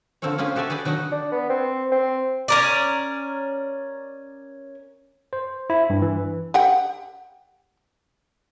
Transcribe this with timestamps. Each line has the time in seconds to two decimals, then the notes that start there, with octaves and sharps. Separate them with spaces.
0.22 D3 F3 C4 A4 A#4 C#5
0.38 A#3 C#4 F4 G4 G#4
0.56 F#4 G4 A4 D5 E5 G#5
0.70 G#4 B4 D5 G5
0.85 D#3 F#3 D4 D#4 D#5 F#5
1.12 D4
1.32 B3
1.50 C4
1.92 C4
2.48 C#4 A#4 D5
5.33 C5
5.70 E4
5.90 G2
6.02 E3
6.54 G4 F#5 G5